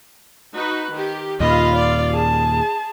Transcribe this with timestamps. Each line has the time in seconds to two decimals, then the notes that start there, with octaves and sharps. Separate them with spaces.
0.54 D#4 F#4 B4
0.91 D#3 G4
1.40 D#2 A#2 F4 D#5 F5 B5
1.75 D5
2.15 G#4 A5